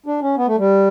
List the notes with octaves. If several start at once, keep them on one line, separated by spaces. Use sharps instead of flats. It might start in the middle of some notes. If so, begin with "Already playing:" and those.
D4
C#4
B3
A3
G3